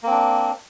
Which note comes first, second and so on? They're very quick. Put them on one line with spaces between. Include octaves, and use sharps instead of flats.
A#3 C4 D4